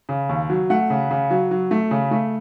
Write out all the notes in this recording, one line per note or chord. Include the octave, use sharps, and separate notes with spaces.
C#3
D#2
F#3
A3 F#5
C#3
C#3
F#3
F#3
A3
C#3
A3